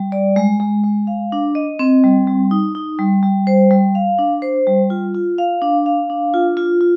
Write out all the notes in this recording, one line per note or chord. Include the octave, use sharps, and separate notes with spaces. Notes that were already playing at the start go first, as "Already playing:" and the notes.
Already playing: G3
D5
G#3
G#3
G#3
F5
D4
D#5
C4
G3
G3
D#4
D#4
G3
G3
C5
G3
F5
D4
C5
G3
F4
F4
F5
D4
F5
D4
F4
F4
F4